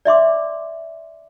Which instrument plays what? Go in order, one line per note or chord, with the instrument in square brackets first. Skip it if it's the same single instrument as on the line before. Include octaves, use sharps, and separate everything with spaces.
[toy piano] D5 E5 C6 D6